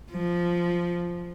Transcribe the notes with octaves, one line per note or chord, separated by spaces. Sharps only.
F3